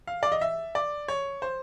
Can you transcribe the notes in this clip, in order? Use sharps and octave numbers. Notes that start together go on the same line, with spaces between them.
F5
D5
D#5
E5
D5
C#5
C5